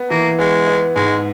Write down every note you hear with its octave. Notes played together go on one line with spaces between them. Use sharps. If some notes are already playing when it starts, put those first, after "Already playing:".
Already playing: B3
E3 A#3
G#3 B3
B3
G#2 G#3